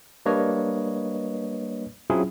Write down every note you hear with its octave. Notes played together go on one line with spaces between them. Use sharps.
G3 A#3 D4 B4 C#5 D#5
F#3 C4 C#4 E4 F4 G#4